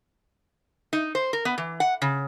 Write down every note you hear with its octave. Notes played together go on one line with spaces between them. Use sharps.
D#4
C5
A#4
B3
E3
F#5
C#3